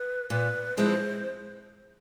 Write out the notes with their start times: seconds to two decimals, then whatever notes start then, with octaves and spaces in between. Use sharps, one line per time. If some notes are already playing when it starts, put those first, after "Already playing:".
Already playing: B4
0.30 A#2 B4
0.77 F3 G#3 C4 E4 C5